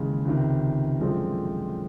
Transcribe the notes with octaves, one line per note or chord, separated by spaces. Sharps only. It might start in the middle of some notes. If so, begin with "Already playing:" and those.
Already playing: D#2 C#3 E3 G#3
C#2 C3 D#3
F#2 D3 F3 G#3 C4